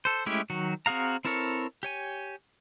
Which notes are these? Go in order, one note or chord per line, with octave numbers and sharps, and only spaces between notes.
A4 C5
G#3 A3 C#4 E4 G4
D#3 F#3 F#4
C4 F#4 G#4 F5 A#5
C4 E4 A4 A#4 C#5
G4 C#5 G#5